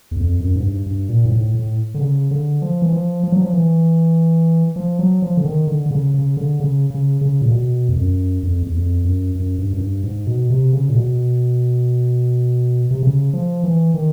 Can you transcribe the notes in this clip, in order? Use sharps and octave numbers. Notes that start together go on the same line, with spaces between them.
E2
F2
F#2
G#2
G2
G2
A#2
G#2
A2
A2
D3
C#3
D3
F3
E3
F3
F3
F#3
F3
E3
F3
F#3
F3
D3
D#3
D3
D3
C#3
C#3
D3
C#3
C#3
C#3
A#2
B2
F2
F#2
F2
E2
F2
F#2
F#2
G2
F#2
G2
G#2
B2
C3
C#3
A#2
B2
C3
C#3
F3
E3
D#3